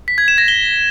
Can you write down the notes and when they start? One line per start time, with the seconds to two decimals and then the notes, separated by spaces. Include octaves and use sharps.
0.08 B6
0.18 G#6
0.28 E7
0.38 A#6
0.48 G7